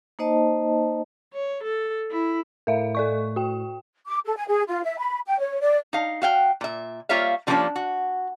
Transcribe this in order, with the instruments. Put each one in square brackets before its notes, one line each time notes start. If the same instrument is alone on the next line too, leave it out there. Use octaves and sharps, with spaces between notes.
[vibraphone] A#3 D#4 C5 D#5 A5
[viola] C#5
A4
E4
[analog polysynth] A2 [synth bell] A#4 E5 F5
[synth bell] A4 D5 C#6
F#4 G5
[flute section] D6
A4
G#5
G#4
F4
E5
B5
G5
C#5
D5
[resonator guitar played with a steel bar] D#4 F5
F#4 F5 G5
A#2 E5
G3 A#3 F4 C#5 E5 F5
D3 F3 G3 A#3 C#4 D4
F#4